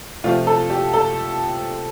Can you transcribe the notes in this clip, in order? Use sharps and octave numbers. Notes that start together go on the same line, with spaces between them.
C3 F3 A3 F4
A4
G4
A4